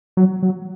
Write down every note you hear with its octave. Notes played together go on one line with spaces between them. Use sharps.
F#3
F#3